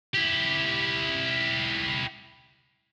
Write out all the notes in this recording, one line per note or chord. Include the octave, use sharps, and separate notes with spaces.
E4 G4